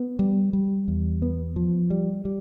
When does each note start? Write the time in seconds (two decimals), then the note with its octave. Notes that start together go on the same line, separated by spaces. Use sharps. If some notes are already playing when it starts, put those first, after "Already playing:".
Already playing: B3
0.19 G3
0.53 G3
0.88 E2
1.22 B3
1.56 F3
1.90 G3
2.25 G3